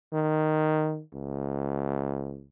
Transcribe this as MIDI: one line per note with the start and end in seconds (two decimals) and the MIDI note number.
0.13 1.02 51
1.13 2.45 37